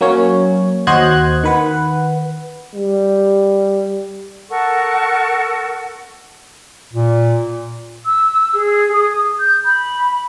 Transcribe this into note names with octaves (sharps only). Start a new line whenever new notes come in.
F#3 A#3 C#4 C#5
D#2 F#4 C5 D#5 F#6 G#6
D#3 B4 F#5
G3
A4 A#4 F#5 C#6
A#2
E6
G#4
D#6
G6
B5